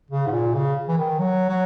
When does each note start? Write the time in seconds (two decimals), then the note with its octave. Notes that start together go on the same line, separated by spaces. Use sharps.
0.11 C#3
0.27 G#2
0.32 A#2
0.55 C#3
0.88 E3
0.98 D#3
1.19 F#3
1.49 F#3